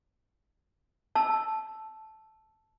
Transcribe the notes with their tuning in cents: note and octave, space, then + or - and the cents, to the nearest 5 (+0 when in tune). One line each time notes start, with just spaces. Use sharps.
A5 -10 E6 +0